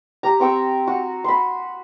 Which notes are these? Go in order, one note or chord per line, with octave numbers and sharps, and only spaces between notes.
G4 A#5
C4 G5 C#6 E6
F#4
B5 C6